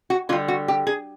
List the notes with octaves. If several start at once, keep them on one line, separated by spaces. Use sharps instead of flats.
F#4
D3 G3 F4
F#4
G4
G#4